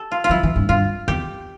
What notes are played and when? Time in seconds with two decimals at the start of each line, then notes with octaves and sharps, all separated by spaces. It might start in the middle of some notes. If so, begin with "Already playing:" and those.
Already playing: G4 A4
0.12 F4
0.24 F4
0.30 F3 E4
0.43 E3
0.56 G2
0.69 G2 F4
1.08 E2 G4